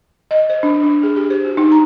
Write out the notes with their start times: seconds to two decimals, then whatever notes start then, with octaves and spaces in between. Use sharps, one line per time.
0.31 D#5
0.50 C5
0.63 D4
0.83 D4
1.03 G#4
1.16 G4
1.30 C5
1.45 F#4
1.57 D#4
1.72 A#5